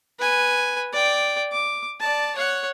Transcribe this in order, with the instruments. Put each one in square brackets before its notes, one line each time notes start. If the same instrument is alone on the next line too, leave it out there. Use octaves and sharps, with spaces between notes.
[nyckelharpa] B4 G#5
D5 G5
D6
D5 A5
C#5 F#5